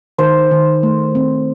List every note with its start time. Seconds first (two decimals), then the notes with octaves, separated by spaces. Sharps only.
0.18 D#3 C5
0.51 D#3
0.83 A3
1.15 C4